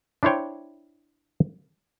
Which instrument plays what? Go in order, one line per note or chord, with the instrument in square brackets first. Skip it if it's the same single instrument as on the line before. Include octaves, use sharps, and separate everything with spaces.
[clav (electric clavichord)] D4 E4 C5 C#5 G5